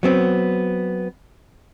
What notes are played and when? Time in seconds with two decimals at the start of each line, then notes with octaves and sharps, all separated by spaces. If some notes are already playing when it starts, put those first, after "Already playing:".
0.03 F#3 B3 C4